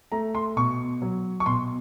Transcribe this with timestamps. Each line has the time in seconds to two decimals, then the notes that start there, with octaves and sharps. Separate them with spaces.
0.12 A3 A#5
0.35 C6
0.57 B2 C#6
1.02 F#3
1.40 C#6
1.46 B2 C6